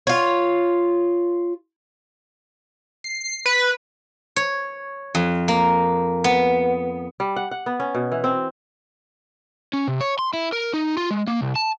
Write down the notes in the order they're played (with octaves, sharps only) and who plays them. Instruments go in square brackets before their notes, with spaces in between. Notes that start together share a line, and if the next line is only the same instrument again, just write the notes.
[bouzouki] F4 C#5
[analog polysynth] C7
B4
[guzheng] C#5
F2
A#3
B3
[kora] G3
F#5
F#5
B3
C#4
B2
E3
C4
[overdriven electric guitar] C#4
C3
C#5
C6
E4
A#4
D#4
F4
G#3
A#3
C2
A5